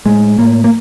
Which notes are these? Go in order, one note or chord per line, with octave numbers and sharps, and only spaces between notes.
A2 G#3
A2 A#3
A#3